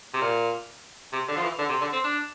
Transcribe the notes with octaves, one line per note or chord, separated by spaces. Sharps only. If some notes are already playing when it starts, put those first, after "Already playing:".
C3
A#2
C3
D3
F3
E3
D3
C3
D3
C4
D4